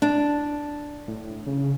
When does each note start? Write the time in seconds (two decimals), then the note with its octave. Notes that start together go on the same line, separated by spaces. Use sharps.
0.02 D4
1.08 A2
1.47 C#3